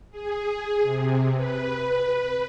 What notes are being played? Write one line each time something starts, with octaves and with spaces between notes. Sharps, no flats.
G#4
C3
B4